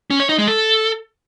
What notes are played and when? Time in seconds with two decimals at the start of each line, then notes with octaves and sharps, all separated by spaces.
0.10 C#4
0.20 C#5
0.29 D#4
0.38 G#3
0.48 A4